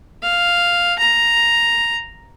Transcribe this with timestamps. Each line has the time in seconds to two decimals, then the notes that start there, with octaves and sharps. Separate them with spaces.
0.23 F5
0.99 A#5